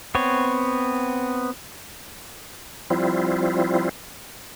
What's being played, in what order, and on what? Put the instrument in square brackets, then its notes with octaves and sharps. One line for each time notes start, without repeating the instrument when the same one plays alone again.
[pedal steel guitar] B3 C4 C#5
[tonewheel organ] F3 G3 C4 E4 F4